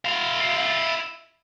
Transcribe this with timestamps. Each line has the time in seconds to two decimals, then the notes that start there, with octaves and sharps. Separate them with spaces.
0.05 E4 F5